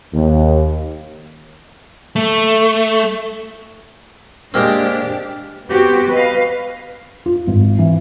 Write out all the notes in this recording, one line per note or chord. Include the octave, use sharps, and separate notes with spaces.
D#2
A3
G#3 A#3 C4 D4 G4
B3 C4 F#4 G4
B4 D#5 F5
F4
G#1
E3